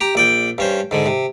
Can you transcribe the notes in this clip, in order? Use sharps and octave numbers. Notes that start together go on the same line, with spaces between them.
G4 A#5
A#1 D5 G5
G2 C#4 C5
G#2 D3 G#3
C3